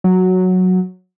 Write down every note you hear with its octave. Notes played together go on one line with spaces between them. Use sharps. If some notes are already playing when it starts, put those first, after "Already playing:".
F#3